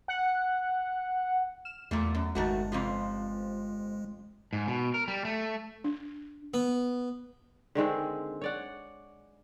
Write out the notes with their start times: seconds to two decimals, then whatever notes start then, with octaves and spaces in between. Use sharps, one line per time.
0.08 F#5
1.65 F6 E7
1.91 E2 A#2 G3 A3
2.15 F#2
2.35 G1 D#3 G#3 A3 F#4
2.72 F2 C3 F3
4.53 G#2
4.68 B2
4.94 A#4
5.08 G3
5.25 A3
5.84 D4
6.54 B3
7.75 D3 D#3 G#3 C4
8.41 C#5 D5 F#5